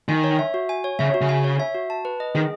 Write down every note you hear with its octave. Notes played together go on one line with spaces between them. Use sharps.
D#3 G#5
C#5
E5
F#4
G#5
C#5
C#3 E5
F#4
C#3
G#5
C#5
E5
F#4
A5
B4
D#5
D#3 G#4